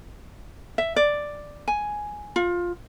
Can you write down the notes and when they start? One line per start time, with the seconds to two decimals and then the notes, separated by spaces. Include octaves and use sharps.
0.78 E5
0.96 D5
1.68 G#5
2.36 F4